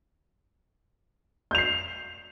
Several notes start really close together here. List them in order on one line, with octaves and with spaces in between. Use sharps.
G6 F7 C7